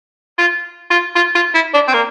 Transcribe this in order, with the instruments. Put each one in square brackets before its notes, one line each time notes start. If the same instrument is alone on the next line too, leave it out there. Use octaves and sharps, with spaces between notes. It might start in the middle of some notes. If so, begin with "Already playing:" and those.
[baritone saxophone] F4
F4
F4
F4
E4
D4
C4
A#3